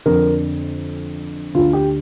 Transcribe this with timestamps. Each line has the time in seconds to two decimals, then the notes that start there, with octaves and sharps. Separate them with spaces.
0.06 F2 D3 A#4
1.54 D2 D3 F4
1.73 G4